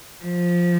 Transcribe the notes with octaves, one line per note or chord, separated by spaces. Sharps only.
F3